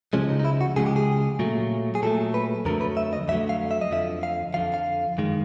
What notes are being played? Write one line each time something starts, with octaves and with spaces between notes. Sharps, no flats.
C#2 C#3 F3 G#3 C#4
D#4
D#4
E4
F#4
C#2 C#3 F3 G#3 G#4
G4
G#4
A#2 F#3 A3
G#4
A#2 F#3 A3 A4
B4
F2 D3 F#3 A3 A#4
B4
E5
D#5
F2 D3 F#3 A3 E5
F5
E5
D#5
F2 D3 F3 E5
F5
F2 D3 F3 F5
F5
F#2 D#3 G#3